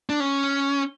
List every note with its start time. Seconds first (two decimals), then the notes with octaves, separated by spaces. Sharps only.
0.09 D4
0.20 C#4